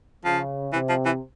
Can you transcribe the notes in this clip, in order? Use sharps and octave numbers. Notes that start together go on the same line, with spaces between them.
C#3 F3
C3 E3
F3
E3